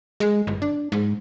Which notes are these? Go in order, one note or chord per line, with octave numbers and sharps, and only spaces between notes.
G#3
G1
D4
G#2